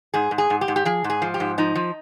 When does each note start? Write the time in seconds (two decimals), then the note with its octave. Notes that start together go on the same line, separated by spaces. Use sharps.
0.14 G#2 G#4
0.31 G#2
0.38 G#4
0.50 G#2
0.61 G4
0.68 G#2
0.76 G4
0.85 F3 G#4
1.04 G#2
1.10 G#4
1.22 F3
1.34 G4
1.40 G#2
1.58 F3 D#4
1.75 F3